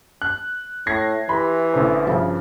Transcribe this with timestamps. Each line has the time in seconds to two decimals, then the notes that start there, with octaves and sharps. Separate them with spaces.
0.22 F#6
0.87 A2 G#6 A#6 C7
1.29 E3 G4 B5 C6
1.73 A1 D3 C5
2.07 G2 C#3 F3